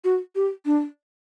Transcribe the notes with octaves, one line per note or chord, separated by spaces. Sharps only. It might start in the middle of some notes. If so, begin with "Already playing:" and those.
F#4
G4
D4